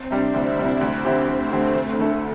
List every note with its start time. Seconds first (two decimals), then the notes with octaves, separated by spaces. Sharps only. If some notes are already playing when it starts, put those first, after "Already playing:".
Already playing: C4
0.11 C3 G3 D4
0.34 D2 E4
0.57 C3 G3 D4
0.81 D2 C4
1.05 D3 C4 E4 G4
1.28 D2 A3
1.50 D3 C4 E4 G4
1.74 D2 D3
1.98 D3 A3 E4 A4